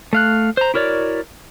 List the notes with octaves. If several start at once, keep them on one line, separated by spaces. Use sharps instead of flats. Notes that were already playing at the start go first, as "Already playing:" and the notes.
A3 F5 F#6
C5 A#5
E4 F#4 A#4 C#5 D5